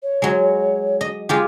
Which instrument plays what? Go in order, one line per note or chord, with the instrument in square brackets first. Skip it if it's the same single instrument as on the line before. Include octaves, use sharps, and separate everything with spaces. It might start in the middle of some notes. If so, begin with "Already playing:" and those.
[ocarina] C#5
[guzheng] F#3 G#3
D#5
G#3 F4 G4